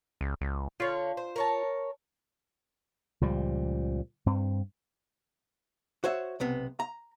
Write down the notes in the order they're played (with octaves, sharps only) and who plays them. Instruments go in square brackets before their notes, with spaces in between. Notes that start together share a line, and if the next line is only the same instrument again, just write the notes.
[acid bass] C#2
C#2
[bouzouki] D3 C#5 [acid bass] F4
[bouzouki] C5
A#4 C#5 A5
[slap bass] C#2 A#2 F3 G3
G2 C4
[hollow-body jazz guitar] F#4 C5 C#5 E5
B1 C3 B3
A#5